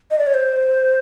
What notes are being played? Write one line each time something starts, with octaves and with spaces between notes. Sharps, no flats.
D#5
D5
C#5
C5